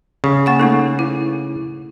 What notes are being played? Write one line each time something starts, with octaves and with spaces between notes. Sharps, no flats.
C#3
A#3 F#5 C#6
A3 D#4 A4
E4